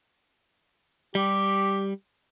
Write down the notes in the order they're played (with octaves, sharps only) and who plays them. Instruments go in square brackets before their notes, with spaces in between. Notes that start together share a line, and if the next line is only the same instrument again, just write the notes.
[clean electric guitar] G3 [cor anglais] G4